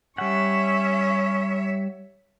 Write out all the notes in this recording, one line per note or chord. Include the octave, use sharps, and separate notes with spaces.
G3 C#4 C#5 E5 F#5